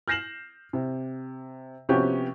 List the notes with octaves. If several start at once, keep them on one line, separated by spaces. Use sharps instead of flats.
F6 G6 A#6 C7 E7 F#7
C3
C3 F3 B3 C#4 F#4 G4